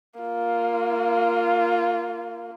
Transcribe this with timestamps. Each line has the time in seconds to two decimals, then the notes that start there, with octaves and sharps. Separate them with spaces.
0.20 A#3 F4